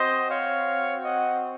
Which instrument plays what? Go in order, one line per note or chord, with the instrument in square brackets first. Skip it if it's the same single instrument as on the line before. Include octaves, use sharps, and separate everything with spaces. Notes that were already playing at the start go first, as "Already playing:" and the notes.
Already playing: [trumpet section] C4 F#4 C5 D#5
C#5 F5
D#5 F#5